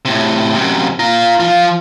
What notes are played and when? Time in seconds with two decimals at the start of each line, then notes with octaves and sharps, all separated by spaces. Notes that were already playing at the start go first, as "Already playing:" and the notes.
0.05 A2 C3
0.55 F#2 C3
0.99 F4 A#5
1.40 F3 F4